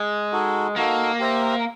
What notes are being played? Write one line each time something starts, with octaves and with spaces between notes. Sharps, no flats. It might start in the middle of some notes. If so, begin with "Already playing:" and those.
Already playing: G#3
D#4 F#4 A4
A#3 D#4 F#4 A4
G4 C5 E5